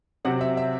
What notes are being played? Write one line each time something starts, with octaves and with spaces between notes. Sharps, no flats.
C3 F#3 C4 F#5
E5
E5